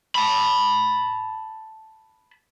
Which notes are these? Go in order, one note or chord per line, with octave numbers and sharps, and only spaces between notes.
A5 B5